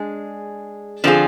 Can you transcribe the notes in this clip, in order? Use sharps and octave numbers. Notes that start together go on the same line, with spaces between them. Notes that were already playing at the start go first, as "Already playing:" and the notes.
Already playing: G#3 D4 G#4
D3 F3 C4 F4 G#4